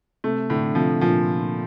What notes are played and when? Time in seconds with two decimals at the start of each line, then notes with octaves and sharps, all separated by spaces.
0.24 C3 A3
0.50 A2 D3
0.75 C3 F3
1.01 A#2 F3